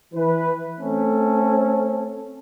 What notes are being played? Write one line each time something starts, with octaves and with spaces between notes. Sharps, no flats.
E3 B4
A3 C4 C#4 A4